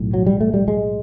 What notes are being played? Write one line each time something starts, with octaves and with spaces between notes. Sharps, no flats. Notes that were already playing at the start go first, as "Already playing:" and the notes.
Already playing: B1 A2
F#3
G3
A3
G3
G#3